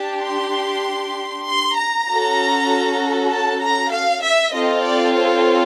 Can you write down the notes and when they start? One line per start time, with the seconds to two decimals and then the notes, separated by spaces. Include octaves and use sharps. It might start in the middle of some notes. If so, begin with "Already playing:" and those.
Already playing: D4 G4 A5
0.24 C6
1.47 C6
1.78 A#5
2.08 C#4 F#4 A4
3.31 A5
3.62 A#5
3.93 F5
4.23 E5
4.54 C4 F4 A4 D#5
4.84 D5
5.15 C#5